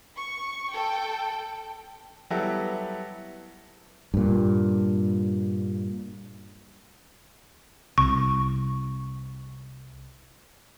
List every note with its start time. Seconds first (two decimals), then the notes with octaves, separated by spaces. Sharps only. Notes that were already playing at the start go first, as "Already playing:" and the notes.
0.18 C#6
0.73 A4 G5
2.30 F#3 G3 B3 E4 G4 A4
4.14 G2 A#2
7.98 C2 C#6